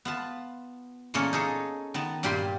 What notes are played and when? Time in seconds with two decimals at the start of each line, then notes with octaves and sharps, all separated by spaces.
0.05 B3 F4 A5
1.14 E2 A#2 A#3 C#4 A4 C#5
1.33 D#4 G#4 A4 C#5
1.94 D#3 B3 A5
2.23 G2 A#2 G3 G4 D5 C6